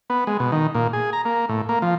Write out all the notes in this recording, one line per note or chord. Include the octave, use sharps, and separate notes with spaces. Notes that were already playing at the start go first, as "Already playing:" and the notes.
B3
G#3
B2
D#3
A#2
G#4
A#5
A#3
A2
A#3
F3